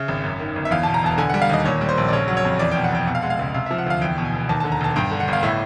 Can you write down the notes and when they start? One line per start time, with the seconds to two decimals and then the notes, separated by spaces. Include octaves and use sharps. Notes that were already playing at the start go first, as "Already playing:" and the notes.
Already playing: C#3 E5
0.08 G#1
0.24 F#2
0.40 D#3
0.56 G1
0.65 E5
0.71 E2 F5
0.83 B2 A5
0.94 A#5
1.03 E1 A5
1.18 D3 G#5
1.30 G3 F#5
1.42 F5
1.50 D#2 D#5
1.65 A#2 C#5
1.81 G3
1.89 C5
1.98 A#1
2.08 D5
2.12 C#3 C#5
2.28 F#3
2.37 C#5
2.45 F2
2.59 E2 D5
2.72 B2 G5
2.84 F#5
2.91 F1 G5
3.07 B2 F#5
3.15 F5
3.22 G#3 F#5
3.30 F5
3.39 C#2
3.54 C3 F5
3.66 F3 E5
3.78 F#5
3.86 D2 F5
4.01 E2 G5
4.18 B2
4.25 G#5
4.33 E1
4.49 D#2 A5
4.60 D3 A5
4.72 A#5
4.81 E1 A5
4.96 G2 G5
5.11 D3
5.20 F#5
5.28 G1 F5
5.43 A2 E5